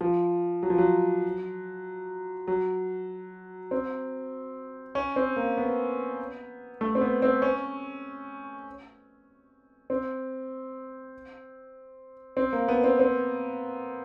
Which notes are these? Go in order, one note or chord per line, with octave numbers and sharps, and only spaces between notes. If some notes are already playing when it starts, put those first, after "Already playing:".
F3
F#3
F3
F#3
F#3
C4
C#4
C4
A#3
B3
A3
C4
B3
C4
C#4
C4
C4
A#3
B3
C4
C4